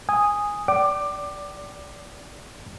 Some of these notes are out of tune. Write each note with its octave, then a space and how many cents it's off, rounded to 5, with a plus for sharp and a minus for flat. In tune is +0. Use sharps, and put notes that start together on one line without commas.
G#5 -10 D#6 +0
D5 -15 G5 -35 D6 +20